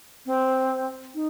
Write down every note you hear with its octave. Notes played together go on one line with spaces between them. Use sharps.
C4
D#4